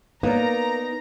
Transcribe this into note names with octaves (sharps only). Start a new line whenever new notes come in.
A#3 B3 D#4 A#4 D5 A#5